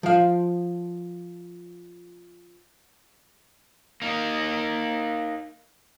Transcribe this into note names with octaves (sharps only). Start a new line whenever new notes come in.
F3 F5
A#3 D#4